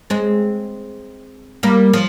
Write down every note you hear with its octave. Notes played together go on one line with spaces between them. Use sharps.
G#3 C4
G3 A#3
F3